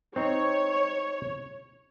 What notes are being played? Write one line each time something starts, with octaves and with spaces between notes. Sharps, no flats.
C4 D#4 C#5